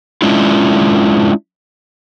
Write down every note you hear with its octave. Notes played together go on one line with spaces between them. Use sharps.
G#3 C#4 D4 E4 F4